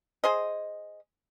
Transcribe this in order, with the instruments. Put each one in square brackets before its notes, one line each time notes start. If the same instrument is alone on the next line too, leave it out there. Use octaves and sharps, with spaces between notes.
[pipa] G#4 C5 D#5